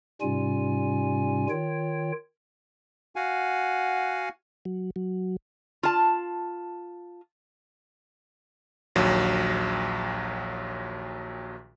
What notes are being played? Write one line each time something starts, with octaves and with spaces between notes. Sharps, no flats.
G#2 C3 G3 C#4 F4 G#5
D#3 F4 C#5 G5
F#4 F5 F#5 G#5
F#3
F#3
F4 A5
A#1 D#2 F#3